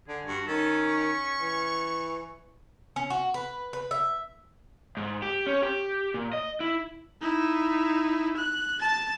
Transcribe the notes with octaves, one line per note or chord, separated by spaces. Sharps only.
D3 G#4
G2 F#4
D#3 C#4 A4
C#6
E3
C#4
F#4
B4
B4
E5
G#2
G4
C#4
G4
A#2
D#5
E4
D#4 E4
F#6
A5 A6